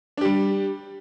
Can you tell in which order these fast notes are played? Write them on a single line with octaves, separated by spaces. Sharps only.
D4 G4 G3